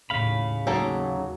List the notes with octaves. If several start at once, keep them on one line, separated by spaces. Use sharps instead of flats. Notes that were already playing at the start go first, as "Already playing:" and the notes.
D#2 A2 C#3 F5 B5
D#2 F#3 A#3 G#4 A4